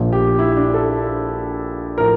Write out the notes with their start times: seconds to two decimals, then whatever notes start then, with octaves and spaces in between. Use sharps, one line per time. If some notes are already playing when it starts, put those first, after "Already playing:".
Already playing: A#1 A#2 F3
0.12 G4
0.39 E4
0.56 D4
0.74 A4
1.98 A2 F3 A#4